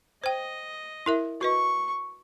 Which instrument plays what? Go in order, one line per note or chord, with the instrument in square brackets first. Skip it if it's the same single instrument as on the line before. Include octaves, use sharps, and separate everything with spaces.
[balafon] C5 G5 [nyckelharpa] D#5
[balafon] E4 A#4 E5
[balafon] F#4 B4 D#5 [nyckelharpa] C#6